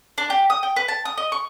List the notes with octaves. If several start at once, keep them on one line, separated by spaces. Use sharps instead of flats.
D4
G4
D#6
G5
B4
A5
D#6
D#5
C#6